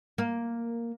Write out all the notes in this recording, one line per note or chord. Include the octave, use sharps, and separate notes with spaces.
A#3